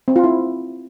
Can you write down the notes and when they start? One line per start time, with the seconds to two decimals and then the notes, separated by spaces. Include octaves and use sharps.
0.08 C4
0.16 F4
0.24 E4